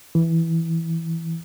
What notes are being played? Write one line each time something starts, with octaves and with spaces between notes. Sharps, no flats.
E3